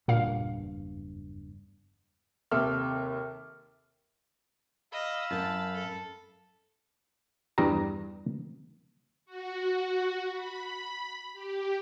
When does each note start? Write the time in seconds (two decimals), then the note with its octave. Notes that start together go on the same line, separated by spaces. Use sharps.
0.08 F#1 E2 G2 A#2 F5
2.51 D#2 C3 A4 E5 D6 F6
4.92 D#5 F5 B5 E6
5.31 F#2 A5
5.75 A4
7.58 E2 G2 G3 A#5
9.26 F#4
10.31 B5
11.33 G4